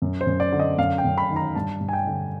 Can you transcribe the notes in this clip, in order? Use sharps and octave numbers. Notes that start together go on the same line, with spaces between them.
F#2
C5
F#2
D5
D3
D#5
F#2 F5
G5
F#2
B5
D#3
A#5
G2 A5
G2
G#5
G5
D3